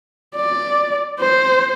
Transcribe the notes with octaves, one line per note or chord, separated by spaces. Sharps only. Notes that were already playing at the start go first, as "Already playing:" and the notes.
D5
C5